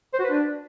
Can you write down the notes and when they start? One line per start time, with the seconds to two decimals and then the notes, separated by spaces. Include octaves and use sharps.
0.14 C5
0.19 F#4
0.25 B4
0.30 D4